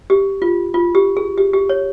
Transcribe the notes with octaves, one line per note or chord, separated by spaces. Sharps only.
G4
F4
F4
G4
G#4
G4
G4
C#5